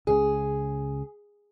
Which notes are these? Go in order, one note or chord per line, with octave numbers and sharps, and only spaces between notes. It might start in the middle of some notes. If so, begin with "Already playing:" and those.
C#2 C#3 G#4